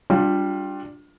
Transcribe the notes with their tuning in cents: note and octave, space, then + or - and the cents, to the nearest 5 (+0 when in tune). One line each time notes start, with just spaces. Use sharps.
G3 +0 D4 +0 F4 +25